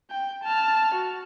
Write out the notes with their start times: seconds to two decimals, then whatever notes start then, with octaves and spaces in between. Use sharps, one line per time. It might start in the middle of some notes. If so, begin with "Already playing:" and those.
0.11 G5
0.43 A5 F6
0.94 F#4